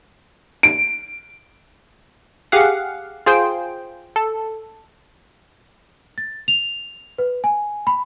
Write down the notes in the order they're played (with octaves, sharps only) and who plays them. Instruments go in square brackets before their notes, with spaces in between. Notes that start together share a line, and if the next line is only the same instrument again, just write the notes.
[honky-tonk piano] D7
[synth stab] G4 G#4 F5 F#5
F4 G#4 C5 G5
A4
[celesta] A6
F7
B4
G#5
B5